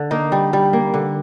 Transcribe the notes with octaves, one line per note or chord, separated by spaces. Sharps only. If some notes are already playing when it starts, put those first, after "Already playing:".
Already playing: D3
A#3 D#4
G3
G3
A#3
D3